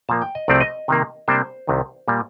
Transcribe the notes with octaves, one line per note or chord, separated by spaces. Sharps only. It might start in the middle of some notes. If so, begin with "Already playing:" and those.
A#2 F3 A#3 A5
G5
D#5
C2 C3 F3 A3 C4 D5
D#5
C3 D#3 A#3
C3 G3 A#3 D4 C5
C2 C3 D#3
A#2 G3 A#3